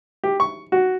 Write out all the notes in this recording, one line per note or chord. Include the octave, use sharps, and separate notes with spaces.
G4
C#6
F#4